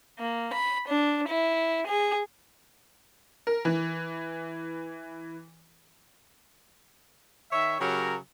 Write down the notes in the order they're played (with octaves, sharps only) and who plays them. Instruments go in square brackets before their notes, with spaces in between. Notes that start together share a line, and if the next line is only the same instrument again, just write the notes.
[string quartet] A#3
B5
D4
E4
G#4
[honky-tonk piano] A#4
E3
[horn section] D#3 C#5 E5
C#3 F#3 G4 A#4